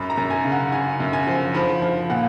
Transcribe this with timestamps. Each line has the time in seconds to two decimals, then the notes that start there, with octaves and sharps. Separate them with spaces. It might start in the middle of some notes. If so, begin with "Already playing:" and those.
Already playing: F#2 B5
0.10 A#5
0.18 F#2
0.30 G#5
0.44 C#3
0.52 F#5
0.72 C#3 G#5
1.00 F#2
1.13 G#5
1.27 F3
1.54 F3 B5
1.82 F3
2.10 A#2 F#5